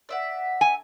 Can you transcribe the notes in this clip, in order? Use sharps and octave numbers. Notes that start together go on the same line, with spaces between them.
D5 E5 F#5
G#5